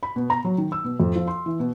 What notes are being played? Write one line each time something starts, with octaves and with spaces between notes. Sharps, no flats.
B5
B2
A#5
F#3
D#3
E6
B2
F2
F3
C6
E3
B2